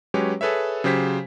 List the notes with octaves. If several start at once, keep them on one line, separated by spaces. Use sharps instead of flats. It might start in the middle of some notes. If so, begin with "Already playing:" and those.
F#3 G#3 C#4 G4 B4 C#5
G#4 A4 B4 C#5 E5
C#3 F#3 G4 C5 G#6 B6